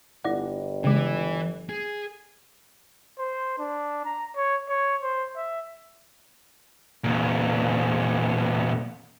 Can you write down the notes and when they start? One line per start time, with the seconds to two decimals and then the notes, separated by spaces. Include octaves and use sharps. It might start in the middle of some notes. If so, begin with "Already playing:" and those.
0.24 G1 E4 D5 F#5
0.84 C#3 E3 G#3
1.69 G#4
3.19 C5
3.59 D4
4.05 A#5
4.36 C#5
4.69 C#5
5.02 C5
5.36 E5
7.04 E2 A#2